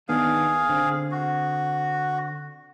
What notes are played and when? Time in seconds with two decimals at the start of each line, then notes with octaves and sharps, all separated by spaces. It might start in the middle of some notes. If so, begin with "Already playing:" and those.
0.09 D#3 B3 D4 G#4 F5
0.69 D3 C4
1.12 F#4